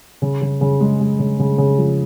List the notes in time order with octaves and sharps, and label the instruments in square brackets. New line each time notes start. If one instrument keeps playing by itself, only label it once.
[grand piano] C#3
C#3
C#3
G#3
G#3
C#3
C#3
C#3
F3